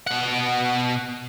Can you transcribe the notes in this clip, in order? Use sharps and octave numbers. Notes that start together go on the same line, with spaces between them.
B2 F#5